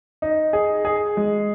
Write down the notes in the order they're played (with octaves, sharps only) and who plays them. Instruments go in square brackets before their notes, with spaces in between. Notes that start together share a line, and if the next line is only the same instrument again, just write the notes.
[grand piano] D#4
G#4
G#4
G#3